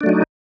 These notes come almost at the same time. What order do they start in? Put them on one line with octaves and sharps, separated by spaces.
D4 A3 F#3 D#4